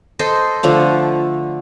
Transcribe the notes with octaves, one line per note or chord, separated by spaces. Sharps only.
A4 C5 D#5
D3 F3 A3